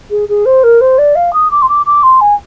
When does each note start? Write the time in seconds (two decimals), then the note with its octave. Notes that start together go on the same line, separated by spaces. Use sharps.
0.10 G#4
0.28 G#4
0.45 C5
0.63 A#4
0.81 C5
0.98 D5
1.15 F5
1.33 D#6
1.51 D6
1.62 C6
1.68 D6
1.86 D6
2.03 C6
2.20 G#5